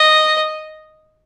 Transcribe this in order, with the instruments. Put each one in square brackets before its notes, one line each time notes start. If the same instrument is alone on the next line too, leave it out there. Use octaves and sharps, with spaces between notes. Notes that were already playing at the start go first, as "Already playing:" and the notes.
Already playing: [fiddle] D#5